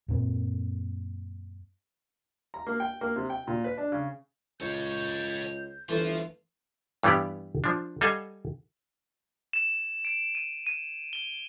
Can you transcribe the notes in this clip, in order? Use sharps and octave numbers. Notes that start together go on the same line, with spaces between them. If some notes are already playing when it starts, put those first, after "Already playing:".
F#2 A#2 C4
A#5
A#3
G5
A#3
C3
G5
A#2
B4
D4
C#3
C#2 A4 C#5 G6
G1 E3 A3 F4 C5
G2 E3 G3 B3 G4 D5
F3 D4
G3 A4 D#5 F5 F#5 G#5
E7
D7
D#7
D#7
G7